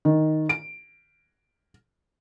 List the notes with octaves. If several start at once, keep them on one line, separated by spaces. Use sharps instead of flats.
D#3
D7